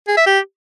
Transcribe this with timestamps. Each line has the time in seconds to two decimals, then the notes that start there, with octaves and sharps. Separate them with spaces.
0.08 G#4
0.17 E5
0.26 G4